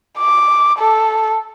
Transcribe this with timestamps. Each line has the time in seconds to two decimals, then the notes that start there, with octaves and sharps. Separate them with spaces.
0.18 D6
0.78 A4